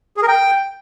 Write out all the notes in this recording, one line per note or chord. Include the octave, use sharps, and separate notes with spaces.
G#4
A#4
G5